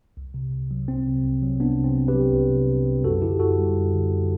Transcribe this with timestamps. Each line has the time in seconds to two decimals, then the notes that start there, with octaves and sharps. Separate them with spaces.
0.17 C2
0.34 C3
0.53 C2
0.71 F#3
0.88 C2 C4
1.07 C3
1.25 C2
1.42 F#3
1.60 C2 B3 D4
1.78 C3
1.84 C4
1.97 C2
2.08 G4 B4
2.14 F#3
2.32 C2
2.50 C3
2.68 C2
2.86 F#3
3.04 F#2 F#4 A4
3.22 D3 E4 G4
3.40 F#2 F#4 A4
3.58 G3
3.76 F#2
3.94 D3
4.12 F#2